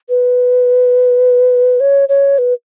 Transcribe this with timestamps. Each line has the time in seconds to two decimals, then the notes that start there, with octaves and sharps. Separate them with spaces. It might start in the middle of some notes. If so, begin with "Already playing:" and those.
0.09 B4
1.80 C#5
2.09 C#5
2.38 B4